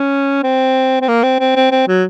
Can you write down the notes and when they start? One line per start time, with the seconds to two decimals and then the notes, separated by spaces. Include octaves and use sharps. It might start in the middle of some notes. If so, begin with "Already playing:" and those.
Already playing: C#4
0.43 C4
1.02 C4
1.09 A#3
1.23 C4
1.40 C4
1.56 C4
1.72 C4
1.88 F#3